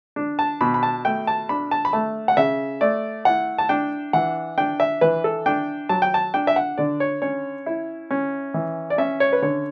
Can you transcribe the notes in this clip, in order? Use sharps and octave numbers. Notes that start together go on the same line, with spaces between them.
D4
A5
B2 B5
B5
A5
A3 G5
A5
D4 B5
A5
B5
A3 A5
F#5
C#3 E5
A3 D5
E4 F#5
A5
D4 G5
E3 F#5
D4 G5
E5
E3 B4
A4
D4 G5
F#3 A5
G5
A5
D4 G5
E5
F#5
D3 D5
C#5
C#4 C#5
E4
C#4
E3
D5
C#4 E5
C#5
B4
D3 C#5